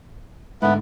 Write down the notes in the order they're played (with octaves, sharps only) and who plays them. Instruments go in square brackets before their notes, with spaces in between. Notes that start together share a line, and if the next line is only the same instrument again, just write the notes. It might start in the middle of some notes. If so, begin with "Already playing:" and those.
[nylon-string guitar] G#2 D3 [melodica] A3 B3 B4